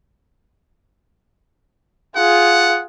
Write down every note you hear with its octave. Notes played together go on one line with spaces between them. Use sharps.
F4 G#4 F#5